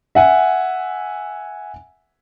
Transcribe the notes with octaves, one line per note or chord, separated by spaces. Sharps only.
E5 F#5 G#5